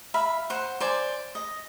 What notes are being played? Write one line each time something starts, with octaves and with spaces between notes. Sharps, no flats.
E5 F5 B5
C5 F#5
C5 D5 G#5
D#5